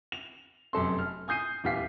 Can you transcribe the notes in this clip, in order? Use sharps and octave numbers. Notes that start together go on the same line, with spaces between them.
F7
F1 F#2 A4 C6
F6
G#5 D#6 G6 C7 D#7
D#1 E2 G4 F5 B6 C7